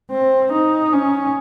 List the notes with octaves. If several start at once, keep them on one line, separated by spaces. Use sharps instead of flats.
C4
D#4
C#4